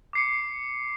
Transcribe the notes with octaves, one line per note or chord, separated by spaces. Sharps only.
D6 C7 C#7